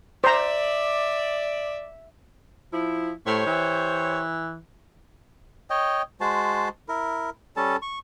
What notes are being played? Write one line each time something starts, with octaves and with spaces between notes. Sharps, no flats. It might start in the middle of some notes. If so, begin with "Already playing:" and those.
C5 D5 E5 A#5
F3 E4
A2 G4 C5 C#5
E3
C#5 D#5 G5
G#3 F#4 C5 A5
E4 A#4
G3 C#4 A4 A5
C#6